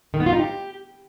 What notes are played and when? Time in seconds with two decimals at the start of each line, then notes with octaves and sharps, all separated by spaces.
0.14 D#3
0.20 B3
0.26 F4
0.33 D#4
0.39 G4